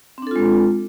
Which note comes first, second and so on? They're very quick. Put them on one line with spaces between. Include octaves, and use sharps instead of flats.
C4 D4 A4 F4 G#3